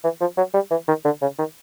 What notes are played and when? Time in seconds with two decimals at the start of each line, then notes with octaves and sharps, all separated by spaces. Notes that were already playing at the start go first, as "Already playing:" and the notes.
0.04 E3
0.21 F3
0.37 F#3
0.54 G3
0.71 E3
0.88 D#3
1.05 D3
1.22 C#3
1.39 D#3